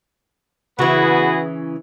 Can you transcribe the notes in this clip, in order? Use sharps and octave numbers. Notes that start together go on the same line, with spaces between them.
C#3 E3 B3 F#4 G#4